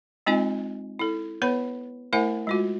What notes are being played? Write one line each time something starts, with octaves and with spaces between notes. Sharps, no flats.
G#3 C4 D#4 F4 D#5 G#5
E4 A4
B3 B4 C#5 B5
A3 E4 A#4 C5 F#5 G#5
G#3 F4 F#4